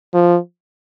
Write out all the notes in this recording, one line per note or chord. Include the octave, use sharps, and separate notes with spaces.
F3